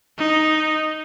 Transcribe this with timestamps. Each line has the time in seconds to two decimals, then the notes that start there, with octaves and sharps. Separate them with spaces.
0.18 D#4